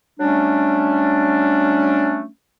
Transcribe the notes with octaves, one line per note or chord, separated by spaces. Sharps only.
F#3 G3 A3 C#4 D4